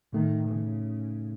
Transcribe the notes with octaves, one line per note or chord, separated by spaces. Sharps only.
A2 D#3 A3 D#4
C#3